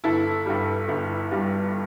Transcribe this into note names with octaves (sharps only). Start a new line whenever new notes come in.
G1 E4 A4
G2 G3
G1
G2 G3